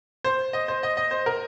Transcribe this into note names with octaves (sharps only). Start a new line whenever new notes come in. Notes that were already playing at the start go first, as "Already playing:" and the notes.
C5
D#5
C5
D#5
D#5
C5
A#4